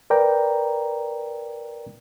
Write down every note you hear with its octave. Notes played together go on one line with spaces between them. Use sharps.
A#4 B4 D5 G5 A#5